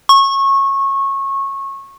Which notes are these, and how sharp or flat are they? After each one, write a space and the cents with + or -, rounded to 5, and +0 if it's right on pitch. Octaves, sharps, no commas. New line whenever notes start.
C#6 -20